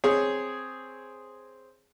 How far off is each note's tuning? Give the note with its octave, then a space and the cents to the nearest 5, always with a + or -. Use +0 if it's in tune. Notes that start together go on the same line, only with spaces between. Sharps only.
C4 +0 G#4 +0 C#5 +0